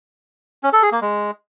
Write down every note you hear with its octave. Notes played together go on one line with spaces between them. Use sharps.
C#4
A4
G#4
A#3
G#3